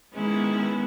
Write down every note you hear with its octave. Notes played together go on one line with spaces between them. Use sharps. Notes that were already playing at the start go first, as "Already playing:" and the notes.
D#3 G#3 B3 C#4 E4
B3